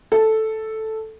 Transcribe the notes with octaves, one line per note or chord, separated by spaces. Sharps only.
A4